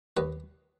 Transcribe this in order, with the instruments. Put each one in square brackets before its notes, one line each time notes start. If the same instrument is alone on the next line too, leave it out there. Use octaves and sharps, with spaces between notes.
[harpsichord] D#2 B4